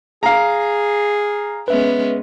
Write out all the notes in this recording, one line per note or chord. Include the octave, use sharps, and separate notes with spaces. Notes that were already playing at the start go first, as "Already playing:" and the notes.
G#4 F5 A#5
G#3 B3 C#4 B4 E5